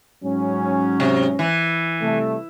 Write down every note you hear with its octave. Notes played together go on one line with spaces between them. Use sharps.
G#2 F#3 C#4
C3
E3
C3 G3 A3